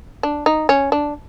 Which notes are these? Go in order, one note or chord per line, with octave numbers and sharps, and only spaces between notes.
D4
D#4
C#4
D4